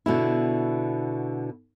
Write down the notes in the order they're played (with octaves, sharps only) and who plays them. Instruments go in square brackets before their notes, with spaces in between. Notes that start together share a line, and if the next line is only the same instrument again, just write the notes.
[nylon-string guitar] B2 D3 E4